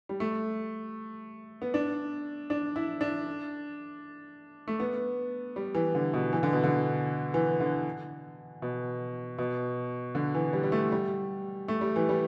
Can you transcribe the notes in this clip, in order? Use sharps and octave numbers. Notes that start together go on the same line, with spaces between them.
G3
A3
B3
D4
D4
E4
D4
A3
B3
G3
E3
D3
B2
E3
D3
B2
D3
E3
D3
B2
B2
D3
E3
G3
G3
A3
G3
A3
G3
E3
G3